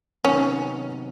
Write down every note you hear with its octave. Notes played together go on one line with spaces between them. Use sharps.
C3 D#3 F#3 B3 C#4 D#4